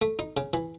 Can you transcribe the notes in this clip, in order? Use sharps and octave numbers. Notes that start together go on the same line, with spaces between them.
A3
D#4
C#3
E3